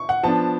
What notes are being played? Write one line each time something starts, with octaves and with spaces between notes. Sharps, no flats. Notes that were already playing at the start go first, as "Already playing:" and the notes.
Already playing: C#6
F#5
F3 B3 D4 A5